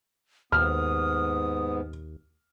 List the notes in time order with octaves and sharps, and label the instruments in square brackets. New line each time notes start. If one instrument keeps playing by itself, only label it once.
[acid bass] D#2 [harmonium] G#2 B3 [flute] D#6 [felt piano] F6